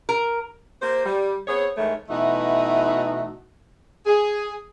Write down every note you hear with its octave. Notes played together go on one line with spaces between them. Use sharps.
A#4
A#3 G4 C5
G3
B3 C4 G#4 C#5
G#2 D#3 E3 A3 C#5
B2 E3 A3 D#4 F#4
G#4